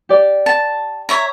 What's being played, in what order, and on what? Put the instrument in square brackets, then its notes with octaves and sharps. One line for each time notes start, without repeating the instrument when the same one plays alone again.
[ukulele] G4 D5
[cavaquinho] A5
C#5 E5 A#5